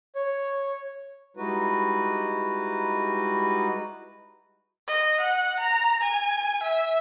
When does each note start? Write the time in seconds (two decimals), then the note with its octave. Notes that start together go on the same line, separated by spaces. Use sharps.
0.15 C#5
1.37 G3 G#3 D#4 E4 F#4 B4
4.88 D#5
5.21 F#5
5.60 A#5
6.02 G#5
6.63 E5